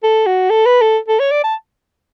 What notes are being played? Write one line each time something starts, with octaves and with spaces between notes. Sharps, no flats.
A4
F#4
A4
B4
A4
A4
C#5
D5
A5